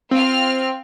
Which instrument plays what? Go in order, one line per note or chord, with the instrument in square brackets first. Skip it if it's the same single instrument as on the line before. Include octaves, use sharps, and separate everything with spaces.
[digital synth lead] C4 [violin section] F4 F6